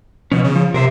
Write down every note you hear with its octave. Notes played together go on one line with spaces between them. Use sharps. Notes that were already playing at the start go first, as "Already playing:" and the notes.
B2 F3 C#4
C#3
F3
C3 A#4 C5 E5